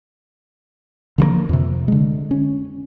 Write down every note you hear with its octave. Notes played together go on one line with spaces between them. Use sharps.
D3 F3 G3 A#3
F2 C3
D3 G#3
C#4